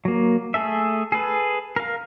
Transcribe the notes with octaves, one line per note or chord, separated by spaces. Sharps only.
F#3 A#3
A3 G#4 A4 E5
G#4 A4 B4
A#4 F5